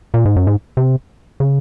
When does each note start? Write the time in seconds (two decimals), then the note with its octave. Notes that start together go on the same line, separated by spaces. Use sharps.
0.14 A#2
0.25 G#2
0.36 F#2
0.47 G#2
0.77 C3
1.40 C#3